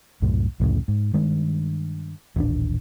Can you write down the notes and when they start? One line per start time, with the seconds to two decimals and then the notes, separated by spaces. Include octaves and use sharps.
0.22 C2 F#2 A2
0.60 C2 F2 A2 C#3
0.88 G#2
1.14 G2 D#3 G#3
2.36 D#1 A1 D4